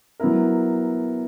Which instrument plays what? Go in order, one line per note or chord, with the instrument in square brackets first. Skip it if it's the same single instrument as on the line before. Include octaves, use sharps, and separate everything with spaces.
[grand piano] F#3 B3 E4 A#4